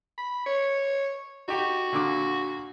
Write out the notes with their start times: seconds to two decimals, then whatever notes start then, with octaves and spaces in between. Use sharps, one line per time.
0.18 B5
0.46 C#5
1.48 D#4 F#4 G4
1.93 A#2 D3 D6